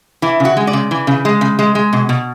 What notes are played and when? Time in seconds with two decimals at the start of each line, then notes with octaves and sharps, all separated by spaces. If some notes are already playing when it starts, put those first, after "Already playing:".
0.22 E3 E4
0.40 C#3 F#4
0.57 G#3
0.67 D5
0.73 C#3
0.91 E3
1.07 C#3
1.25 G#3
1.41 C#3
1.59 G#3
1.75 G#3
1.93 B2
2.09 B2